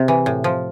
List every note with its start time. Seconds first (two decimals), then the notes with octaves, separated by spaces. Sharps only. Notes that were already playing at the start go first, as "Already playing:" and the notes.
Already playing: C3
0.08 E3
0.26 A2
0.44 F3